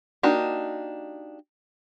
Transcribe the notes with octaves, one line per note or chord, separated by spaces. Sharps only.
A#3 D4 D#4 F#4 G4